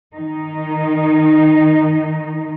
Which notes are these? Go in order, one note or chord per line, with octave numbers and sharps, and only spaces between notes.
D#3 D#4